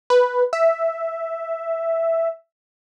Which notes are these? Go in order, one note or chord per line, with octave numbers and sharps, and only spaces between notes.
B4
E5